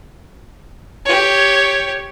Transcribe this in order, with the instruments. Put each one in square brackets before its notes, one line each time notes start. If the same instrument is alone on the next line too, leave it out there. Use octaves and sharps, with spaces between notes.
[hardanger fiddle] G4 C#5